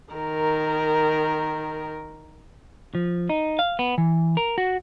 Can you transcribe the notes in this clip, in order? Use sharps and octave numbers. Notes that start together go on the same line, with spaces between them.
D#3 A#4
F3
D#4
F5
B3
E3
A#4
F#4